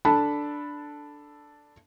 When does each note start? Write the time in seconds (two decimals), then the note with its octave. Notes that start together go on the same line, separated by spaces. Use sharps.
0.05 D4 A4 A5 B5